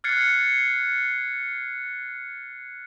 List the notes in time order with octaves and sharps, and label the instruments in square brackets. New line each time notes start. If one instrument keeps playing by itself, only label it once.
[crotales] F6 F#6 G#6 A6 C7 C#7